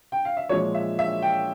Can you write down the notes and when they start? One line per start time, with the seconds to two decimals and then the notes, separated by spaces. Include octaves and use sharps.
0.12 G5
0.25 F5
0.37 E5
0.49 A#2 F3 G#3 C#5
0.74 E5
0.99 E5
1.22 G5